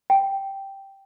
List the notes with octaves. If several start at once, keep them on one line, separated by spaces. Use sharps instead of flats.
G5